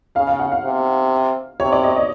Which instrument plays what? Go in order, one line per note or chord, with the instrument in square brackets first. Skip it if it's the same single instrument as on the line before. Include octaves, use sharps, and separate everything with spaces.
[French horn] C#3 [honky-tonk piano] F5
[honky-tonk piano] F5
F#5
F5
[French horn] C3
[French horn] C3 [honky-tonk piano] C#5
[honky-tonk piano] D5
D#5
D#5